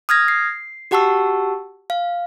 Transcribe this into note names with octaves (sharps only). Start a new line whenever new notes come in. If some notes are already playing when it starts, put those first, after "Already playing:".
D#6 F6 G#6 A#6
C7
F#4 G4 F#5 A5 C#6 E6
F5